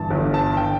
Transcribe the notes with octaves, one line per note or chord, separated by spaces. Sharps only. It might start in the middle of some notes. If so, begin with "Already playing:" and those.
Already playing: G1 G2 E3 A5
G1 G2 E3
A5
D3 G5